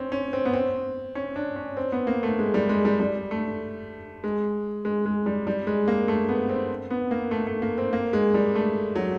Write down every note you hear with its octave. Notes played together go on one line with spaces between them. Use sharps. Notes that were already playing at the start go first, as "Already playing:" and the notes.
Already playing: C4 C#4
C#4
C4
B3
C4
C#4
D4
C#4
C4
B3
A#3
A3
G#3
G3
G#3
G3
G3
A3
G#3
G#3
G#3
G3
G3
G#3
A#3
A3
B3
C4
B3
A#3
A3
A3
A#3
C4
A#3
G#3
G3
A3
F#3